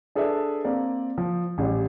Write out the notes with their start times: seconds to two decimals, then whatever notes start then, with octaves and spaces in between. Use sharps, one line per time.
0.15 D4 G#4 A4 B4 D5 E5
0.65 A#3 C4 D5
1.18 F3
1.58 A1 G3 C#4